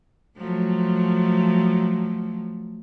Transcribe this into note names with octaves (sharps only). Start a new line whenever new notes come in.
F3 F#3 A3